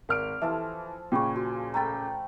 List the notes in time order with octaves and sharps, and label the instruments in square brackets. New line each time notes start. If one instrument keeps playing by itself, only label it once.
[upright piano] G#1 F6 D7 [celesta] A#4
[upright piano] E3 [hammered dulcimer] F3 F4 A4 [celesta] E5
[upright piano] A#2 C#3 [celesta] G5 B5 C#6
[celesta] F#4 [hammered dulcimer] C6
[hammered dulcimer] A3 G5 B5 [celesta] A#5 A6